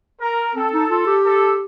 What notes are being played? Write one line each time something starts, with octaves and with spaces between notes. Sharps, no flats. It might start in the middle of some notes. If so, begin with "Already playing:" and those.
A#4
C4 A4
D#4
F4
G4
A4